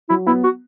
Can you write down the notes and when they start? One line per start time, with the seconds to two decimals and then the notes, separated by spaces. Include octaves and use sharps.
0.09 F#3 E4
0.27 B3 E4
0.44 F#4